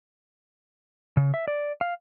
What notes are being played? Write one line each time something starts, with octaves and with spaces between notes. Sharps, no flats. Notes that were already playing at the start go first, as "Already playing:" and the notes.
C#3
E5
D5
F5